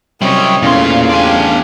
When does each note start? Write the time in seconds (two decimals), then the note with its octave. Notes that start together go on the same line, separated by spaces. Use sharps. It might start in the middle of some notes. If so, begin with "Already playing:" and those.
0.22 F#2 C3 G3 C#5 D#5
0.62 E2 A#2 C#3 E3 A3 F5 C6
1.10 D4 G4 F5 G#5